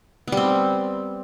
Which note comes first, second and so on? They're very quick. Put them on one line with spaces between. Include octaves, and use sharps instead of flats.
B3 G3 C4